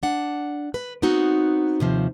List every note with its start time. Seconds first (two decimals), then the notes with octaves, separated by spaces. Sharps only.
0.03 D4 F#5
0.74 B4
1.02 B3 C4 D#4 F#4
1.80 D#2 C3 F3